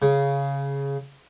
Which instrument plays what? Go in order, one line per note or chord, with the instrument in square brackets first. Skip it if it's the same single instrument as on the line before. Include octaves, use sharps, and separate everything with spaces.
[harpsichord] C#3